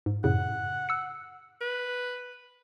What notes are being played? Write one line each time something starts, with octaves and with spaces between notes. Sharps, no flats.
G#2
F#2 A2 C#3 F#5
E6 C#7
B4